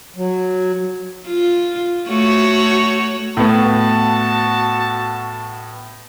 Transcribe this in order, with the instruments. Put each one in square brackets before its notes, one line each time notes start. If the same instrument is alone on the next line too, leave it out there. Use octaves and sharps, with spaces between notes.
[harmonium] F#3
[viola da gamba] F4
A3 F#4 C#5
[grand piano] A2 B3 [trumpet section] F#4 A5